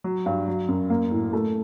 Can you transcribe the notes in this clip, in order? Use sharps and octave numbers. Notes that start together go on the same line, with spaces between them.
F#3
G2
F#3
F#2
A#3
A2
A3